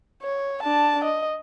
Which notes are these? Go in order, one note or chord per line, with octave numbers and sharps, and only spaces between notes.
C#5
D4 A5
D#5